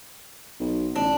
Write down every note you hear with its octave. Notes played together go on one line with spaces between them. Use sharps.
B1
A1 D4